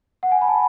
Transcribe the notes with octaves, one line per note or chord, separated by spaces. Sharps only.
F#5
G#5
B5
A5